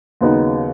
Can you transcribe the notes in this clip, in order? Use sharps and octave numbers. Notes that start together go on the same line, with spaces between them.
D#2 C#3 F#3 B3 D#4